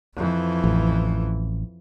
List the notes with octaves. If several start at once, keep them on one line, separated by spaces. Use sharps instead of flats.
F2 E3
A1